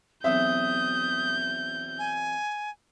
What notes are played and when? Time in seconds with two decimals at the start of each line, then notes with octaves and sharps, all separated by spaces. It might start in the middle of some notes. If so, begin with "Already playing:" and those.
0.24 B1 E2 C3 E5 D#6 G6
1.99 G#5